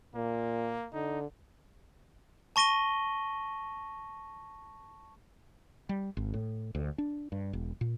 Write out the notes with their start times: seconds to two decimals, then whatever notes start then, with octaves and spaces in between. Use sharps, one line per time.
0.15 A#2 A#3
0.93 D3 D#4
2.56 A5 C#6 A#6 D#7 G7
5.89 G3
6.17 G#1
6.34 A2
6.75 D2
6.98 D4
7.32 G2
7.53 E1
7.81 A#2